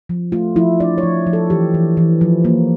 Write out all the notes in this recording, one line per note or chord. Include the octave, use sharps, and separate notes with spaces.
F3
A3 F4
F3 E4
D4 D5
C#5
F3
F3
A4
E3 G4
E3
E3
F3
A#3